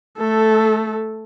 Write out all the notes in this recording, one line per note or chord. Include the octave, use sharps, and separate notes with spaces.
A3 A4